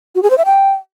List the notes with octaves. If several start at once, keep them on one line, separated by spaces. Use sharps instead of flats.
F#4
G#4
C5
E5
G5